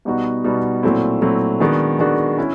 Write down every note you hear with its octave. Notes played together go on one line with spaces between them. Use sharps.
B2 G3 B3 D#4 F#4
B2 G3 B3 D#4 F#4
A#2 F#3 A3 C4 E4
A#2 F#3 A3 C4 E4
D#3 G#3 B3 D4 F#4
D#3 G#3 B3 D4 F#4
C#4 E4